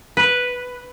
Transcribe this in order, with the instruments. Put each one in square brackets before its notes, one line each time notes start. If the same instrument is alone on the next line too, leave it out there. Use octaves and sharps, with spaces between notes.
[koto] B4